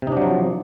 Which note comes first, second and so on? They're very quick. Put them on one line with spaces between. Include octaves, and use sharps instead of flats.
C3 D#4 D4 F#3 F3